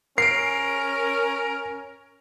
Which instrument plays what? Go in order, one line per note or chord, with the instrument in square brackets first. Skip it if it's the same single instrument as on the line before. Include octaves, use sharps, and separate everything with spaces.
[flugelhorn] C#4 [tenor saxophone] A#4 [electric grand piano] C7 D7